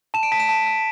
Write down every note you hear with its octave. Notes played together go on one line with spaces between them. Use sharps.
A5 E7
D7
A5 B6
E7
A5
A5